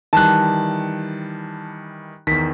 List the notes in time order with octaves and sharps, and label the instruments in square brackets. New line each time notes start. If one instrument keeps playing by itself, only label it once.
[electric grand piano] D#3 E3 G3 [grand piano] A5 F#6
[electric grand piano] E2 D#3 [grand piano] B6